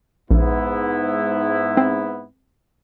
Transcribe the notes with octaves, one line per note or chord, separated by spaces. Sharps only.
A#1 G#2 B3 E4
C4